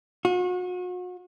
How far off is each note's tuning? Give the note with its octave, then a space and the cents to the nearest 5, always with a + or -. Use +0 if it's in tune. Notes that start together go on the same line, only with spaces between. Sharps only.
F#4 -40